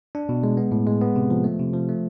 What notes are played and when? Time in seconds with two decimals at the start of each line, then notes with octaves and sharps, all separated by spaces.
0.15 D4
0.29 B2
0.43 G#3
0.57 B3
0.72 A2
0.87 G#3
1.01 B3
1.16 C3
1.31 F3
1.44 A3
1.59 C3
1.73 F3
1.89 A3